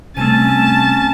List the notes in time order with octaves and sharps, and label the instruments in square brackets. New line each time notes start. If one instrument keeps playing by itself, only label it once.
[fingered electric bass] C3 G3 C4 [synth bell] A3 D#7 [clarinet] C#4 [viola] A5